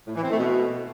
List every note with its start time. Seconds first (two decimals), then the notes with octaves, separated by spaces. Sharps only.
0.07 A2
0.15 E3
0.23 C4
0.30 A3
0.38 B2